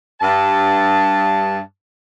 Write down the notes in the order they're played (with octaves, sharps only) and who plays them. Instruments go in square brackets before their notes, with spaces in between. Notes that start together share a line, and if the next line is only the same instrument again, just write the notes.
[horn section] G2 A5